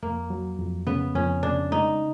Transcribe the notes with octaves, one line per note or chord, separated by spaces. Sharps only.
F2 A#3
F#3
F2
C#3 B3
F2 C#4
C#3 D4
G#3 D#4